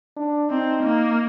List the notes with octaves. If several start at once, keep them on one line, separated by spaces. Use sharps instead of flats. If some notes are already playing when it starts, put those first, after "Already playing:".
D4
C4 D#4
A#3